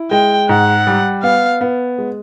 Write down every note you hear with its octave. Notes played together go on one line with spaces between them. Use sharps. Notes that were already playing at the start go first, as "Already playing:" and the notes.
Already playing: E4
G#3 G5
G#2 F#5
G3
B3 F5
B3
G#3